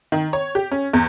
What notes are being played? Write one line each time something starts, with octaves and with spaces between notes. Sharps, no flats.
D#3
C#5
G4
C#4
E2